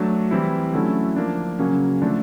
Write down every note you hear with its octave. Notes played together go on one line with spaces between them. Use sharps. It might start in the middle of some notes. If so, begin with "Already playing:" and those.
Already playing: F#3 A3 D4
E3 G3 C4 E4
D3 F#3 A3 C#4 E4
F3 A#3 D4
C#3 F#3 A#3 C#4
D3 F3 A3 D4